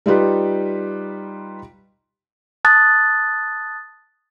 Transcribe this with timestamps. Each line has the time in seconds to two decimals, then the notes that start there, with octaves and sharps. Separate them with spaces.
0.06 G3 D#4 F4 G4 B4
2.65 A5 D#6 F#6 A6